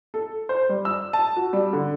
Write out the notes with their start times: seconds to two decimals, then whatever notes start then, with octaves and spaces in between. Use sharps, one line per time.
0.14 A4
0.49 C5
0.69 G3
0.85 E6
1.13 A5
1.36 F#4
1.53 G3
1.73 D3